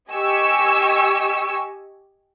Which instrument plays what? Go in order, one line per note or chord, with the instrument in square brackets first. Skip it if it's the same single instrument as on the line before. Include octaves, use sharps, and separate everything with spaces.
[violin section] G4 D#5 G#5 C#6 E6